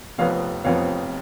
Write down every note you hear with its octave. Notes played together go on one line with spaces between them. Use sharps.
F1 F2 F3 B3 C#5 F5
F1 F2 F3 B3 C#5 F5